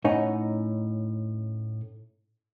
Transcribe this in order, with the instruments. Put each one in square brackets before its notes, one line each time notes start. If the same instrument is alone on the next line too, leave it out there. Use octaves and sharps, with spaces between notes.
[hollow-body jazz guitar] A2 C#4 D#4 C#5 F#5 G#5